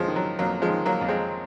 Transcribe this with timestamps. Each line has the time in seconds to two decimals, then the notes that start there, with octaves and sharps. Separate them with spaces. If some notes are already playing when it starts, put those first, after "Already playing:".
Already playing: F2 F3 G#3 C#4 F4
0.08 D#3
0.16 F#3
0.39 F2 F#3 A#3
0.62 F3 G#3
0.70 D#3
0.86 F#3 A#3
1.01 F2
1.08 G#3 C4